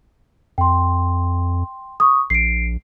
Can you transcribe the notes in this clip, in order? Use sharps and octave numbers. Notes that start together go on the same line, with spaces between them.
F2 G5 C6
C#6 D#6
A#1 C7 D7